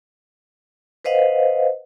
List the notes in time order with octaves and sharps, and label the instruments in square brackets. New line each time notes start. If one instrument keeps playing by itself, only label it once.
[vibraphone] B4 C5 D#5 F5 F#5